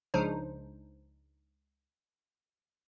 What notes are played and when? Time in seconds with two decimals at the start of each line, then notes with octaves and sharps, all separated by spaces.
0.14 C#2 C#3 F3 D4 D#4 C5